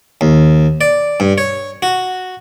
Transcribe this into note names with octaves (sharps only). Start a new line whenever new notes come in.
D#2
D5
G2
C#5
F#4